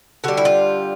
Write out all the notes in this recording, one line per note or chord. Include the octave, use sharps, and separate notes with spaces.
D3 G3 F#4
E4
F4